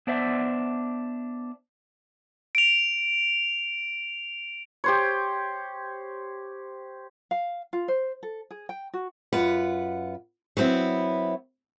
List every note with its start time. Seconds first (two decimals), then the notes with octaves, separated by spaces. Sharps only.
0.07 B3 D4 C5 D5 E5
2.55 D7 F7
4.84 G4 C5 C#5
7.31 F5
7.73 F4
7.88 C5
8.23 A4
8.51 G#4
8.69 G5
8.94 F#4
9.33 F#2 F4 B4 F#5
10.57 F#3 B3 C4 E4